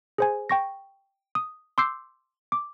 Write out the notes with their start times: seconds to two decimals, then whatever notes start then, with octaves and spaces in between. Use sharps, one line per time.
0.18 G#4 C5 G#5
0.49 G5 C#6 A#6
1.35 D#6
1.78 C6 D6 E6 G6 C7
2.52 D6